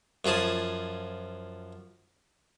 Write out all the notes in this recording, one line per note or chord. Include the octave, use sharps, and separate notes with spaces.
F#2 F3 G#4 A5